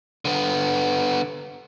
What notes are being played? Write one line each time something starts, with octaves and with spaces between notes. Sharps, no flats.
D3 B3